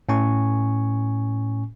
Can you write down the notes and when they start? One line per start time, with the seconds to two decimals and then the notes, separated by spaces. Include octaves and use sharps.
0.09 A2 C#4 G#5 C#6